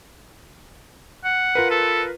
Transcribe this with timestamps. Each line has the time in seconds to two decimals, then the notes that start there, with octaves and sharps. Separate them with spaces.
1.24 F#5
1.55 F4 A#4 B4
1.71 A4